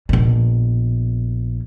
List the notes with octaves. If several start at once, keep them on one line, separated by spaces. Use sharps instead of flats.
A#1 B2